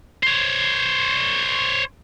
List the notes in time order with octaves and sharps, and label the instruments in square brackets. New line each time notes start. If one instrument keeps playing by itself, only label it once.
[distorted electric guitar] C5 C#5